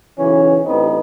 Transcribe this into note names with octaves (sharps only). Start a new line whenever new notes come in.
B1 C#3 E3 C#4
A1 G2 B3 C4 D#4